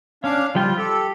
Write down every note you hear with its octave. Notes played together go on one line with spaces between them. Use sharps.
C#4 D4 F5
F3 G3 F4 G5
G4 A4